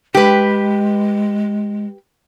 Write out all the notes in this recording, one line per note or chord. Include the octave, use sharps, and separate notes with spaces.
G#3 G4 B4